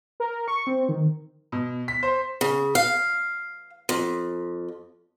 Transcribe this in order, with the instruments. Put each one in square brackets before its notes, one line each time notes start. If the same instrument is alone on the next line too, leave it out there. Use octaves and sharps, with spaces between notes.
[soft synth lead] A#4
C#6
C4
D#3
[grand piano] B2
B6
C5
[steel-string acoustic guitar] C#3
F5
F2